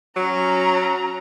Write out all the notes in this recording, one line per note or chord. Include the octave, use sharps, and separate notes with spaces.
F#3 C#4 A#5